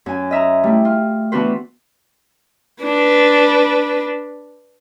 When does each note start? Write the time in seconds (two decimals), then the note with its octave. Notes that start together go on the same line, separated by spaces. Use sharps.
0.06 F#2 G#5
0.31 D#5 E5 A#5
0.64 G3 A3 E4
0.85 F4
1.32 E3 B3 D4 F#4 B4 C5
2.83 D4 B4